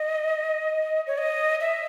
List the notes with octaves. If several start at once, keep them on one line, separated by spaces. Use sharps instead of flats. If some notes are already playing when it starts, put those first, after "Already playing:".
Already playing: D#5
C#5
D#5
E5